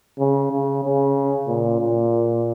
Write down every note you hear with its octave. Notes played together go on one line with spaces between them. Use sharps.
C#3
C#3
C#3
A#2
A#2